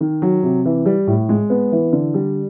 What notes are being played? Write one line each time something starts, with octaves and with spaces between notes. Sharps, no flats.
D#3
F#3
C3
E3
G3
A2
G#3
B3
E3
D3
G3